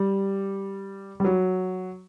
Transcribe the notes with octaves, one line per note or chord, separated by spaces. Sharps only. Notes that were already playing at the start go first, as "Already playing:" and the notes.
Already playing: G3
G3
F#3